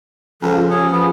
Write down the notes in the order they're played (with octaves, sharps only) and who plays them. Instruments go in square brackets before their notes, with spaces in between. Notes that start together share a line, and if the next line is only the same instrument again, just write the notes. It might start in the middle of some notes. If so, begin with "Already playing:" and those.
[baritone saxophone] C#2 [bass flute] F3 [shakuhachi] A4
[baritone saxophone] C#4 [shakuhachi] G4 [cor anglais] G#4
[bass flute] F3 [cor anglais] B3 [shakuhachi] G#4